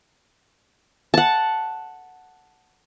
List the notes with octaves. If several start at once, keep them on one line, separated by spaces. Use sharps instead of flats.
F#5 A5